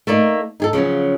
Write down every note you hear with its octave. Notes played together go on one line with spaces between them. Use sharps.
A3 A#3 D#4 D5
D#4 G#4 A4
C#3 F3 F#3 C#4